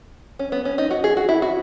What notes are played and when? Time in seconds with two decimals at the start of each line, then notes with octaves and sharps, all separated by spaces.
0.39 C#4
0.52 B3
0.65 C#4
0.78 D#4
0.91 F#4
1.04 G#4
1.17 F#4
1.29 E4
1.42 F#4